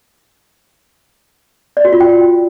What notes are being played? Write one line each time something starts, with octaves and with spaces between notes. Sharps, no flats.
D5
F#4
F4
G5